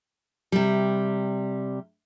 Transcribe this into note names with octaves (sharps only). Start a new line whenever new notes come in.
C3 G3